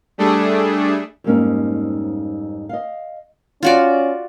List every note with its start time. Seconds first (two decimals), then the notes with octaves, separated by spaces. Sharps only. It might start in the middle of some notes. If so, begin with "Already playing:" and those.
0.18 G3 A3 D4 G#4 A4
1.24 F2 G#2 G3 A#3 C#4 D#4
2.69 D#5 F5
3.63 C#4 F4 F#4 D5